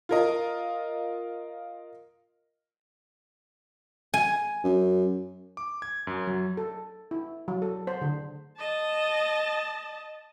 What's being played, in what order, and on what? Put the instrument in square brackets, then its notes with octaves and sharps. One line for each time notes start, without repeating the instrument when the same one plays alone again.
[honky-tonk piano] F4 A#4 D#5
[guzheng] G#5
[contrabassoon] F#2
[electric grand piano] D6
G#6
F#2
F#3
[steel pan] A4
E4
F#3
A4
C5
D3
[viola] D#5 A5